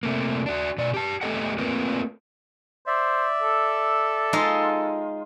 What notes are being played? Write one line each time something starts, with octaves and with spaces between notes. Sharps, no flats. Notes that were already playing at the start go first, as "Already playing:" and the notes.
C3 A3 A#3
D4 F#4
B2 D5
G4 A5
A3 B3 G4 A4 D#5 F#5
A3 A#3 C4 F4 A#4 B4
C5 D5 E5
A4
G#3 D#4 F4